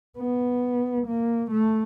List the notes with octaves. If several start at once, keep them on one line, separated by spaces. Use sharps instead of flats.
B3
A#3
A3